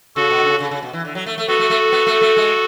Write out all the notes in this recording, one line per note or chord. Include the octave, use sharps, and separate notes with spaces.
C#3 F#4 A4
B2
D3
C#3
C#3
C#3
B2
E3
D3
F#3
A3
A3
B3 F#4 A4
A3
A3
B3
A3
A3
G#3